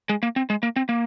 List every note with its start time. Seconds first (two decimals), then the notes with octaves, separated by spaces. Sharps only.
0.09 G#3
0.23 A#3
0.36 C4
0.50 G#3
0.63 A#3
0.76 C4
0.89 A#3